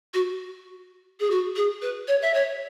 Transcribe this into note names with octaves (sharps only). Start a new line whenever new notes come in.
F#4
G#4
F#4
G#4
B4
C#5
E5
C#5